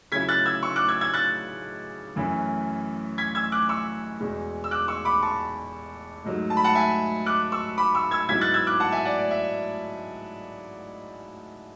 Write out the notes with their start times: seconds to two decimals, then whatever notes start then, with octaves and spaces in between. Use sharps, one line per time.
0.12 C#3 F#3 C#4 E4 G#6 B6
0.29 F#6 A6
0.46 E6 G#6
0.63 C#6 E6
0.76 D6 F#6
0.88 E6 G#6
1.01 E6 G#6
1.13 F#6 A6
2.16 F#2 E3 A3 C#4 E4
3.18 G#6 B6
3.35 E6 G#6
3.52 D6 F#6
3.69 C#6 E6
4.20 E2 B2 G#3
4.64 E6
4.71 D6 F#6
4.88 C#6 E6
5.05 B5 D6
5.22 A5 C#6
6.24 G#2 F#3 A3
6.50 A5
6.57 B5
6.64 F#5 A5
6.75 E5 G#5
7.26 D6 F#6
7.52 C#6 E6
7.77 B5 D6
7.95 C#6 E6
8.11 E6 G#6
8.28 G#2 F#3 B3 E4 G#6 B6
8.41 F#6 A6
8.54 E6 G#6
8.67 D6 F#6
8.80 F#5 A5
8.92 E5 G#5
9.05 D5 F#5
9.18 D5
9.31 E5